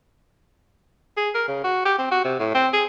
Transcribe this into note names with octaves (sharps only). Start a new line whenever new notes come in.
G#4
A#4
C#3
F#4
G4
C4
F#4
C3
A2
C4
G#4